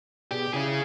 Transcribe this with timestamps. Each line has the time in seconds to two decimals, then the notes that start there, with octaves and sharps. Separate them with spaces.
0.31 B2 G4 G#4 D5
0.54 C#3 C#4 E4 G#4